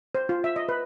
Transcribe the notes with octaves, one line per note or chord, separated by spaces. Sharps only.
C5
F4
E5
D#5
B4